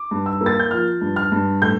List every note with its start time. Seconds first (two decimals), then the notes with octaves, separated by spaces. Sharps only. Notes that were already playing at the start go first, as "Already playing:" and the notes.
Already playing: D6
0.11 G2
0.26 E6
0.41 A#3
0.46 A6
0.59 G6
0.71 F3 F6
1.01 G2
1.16 F6
1.32 G2
1.62 A2 G6